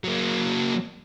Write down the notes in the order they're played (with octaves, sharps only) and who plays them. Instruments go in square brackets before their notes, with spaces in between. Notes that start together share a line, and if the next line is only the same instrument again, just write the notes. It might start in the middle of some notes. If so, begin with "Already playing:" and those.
[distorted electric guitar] F#3 A#3